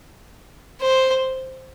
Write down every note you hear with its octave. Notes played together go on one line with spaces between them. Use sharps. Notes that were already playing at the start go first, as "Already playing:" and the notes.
C5